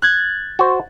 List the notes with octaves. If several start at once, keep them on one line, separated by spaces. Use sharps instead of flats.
F#6 G#6 A6
F#4 C5